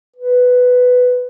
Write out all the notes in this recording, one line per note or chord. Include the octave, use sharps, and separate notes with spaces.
B4